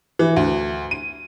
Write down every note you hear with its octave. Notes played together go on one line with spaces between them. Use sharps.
E3
D2
D#7